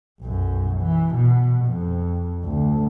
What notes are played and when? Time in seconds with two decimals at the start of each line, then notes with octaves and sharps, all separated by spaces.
0.21 B1 F#2
0.81 E3
1.14 B2
1.67 F2
2.45 D2